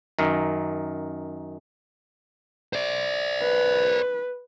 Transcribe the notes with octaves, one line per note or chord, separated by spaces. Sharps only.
F#2 D#3
C5 D5
B4